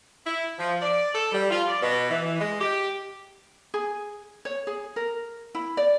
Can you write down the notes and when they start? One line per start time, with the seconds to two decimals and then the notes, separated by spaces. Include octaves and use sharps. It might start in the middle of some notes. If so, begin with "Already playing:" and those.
0.26 E4
0.59 F3
0.82 D5
1.14 A4
1.32 G3
1.50 F4
1.68 D5
1.82 B2
2.10 E3
2.40 G#3
2.61 G4
3.74 G#4
4.45 C#5
4.67 G#4
4.96 A#4
5.55 E4
5.77 D5